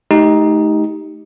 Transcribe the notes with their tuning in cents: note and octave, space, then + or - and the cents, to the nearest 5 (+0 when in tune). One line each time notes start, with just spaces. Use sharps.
A3 -35 D#4 +10 G4 +0